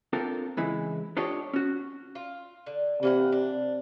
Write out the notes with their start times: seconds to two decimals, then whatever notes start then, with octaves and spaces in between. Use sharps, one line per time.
0.13 C4 D4 F4 A4 A#4
0.57 C#2 E3 G#3 E4
1.17 D4 F4 G4 A4 C#5 D#5
1.53 C#4 F#4
2.15 F4
2.66 D3
3.03 C3 E3 A#3 F#5
3.32 D4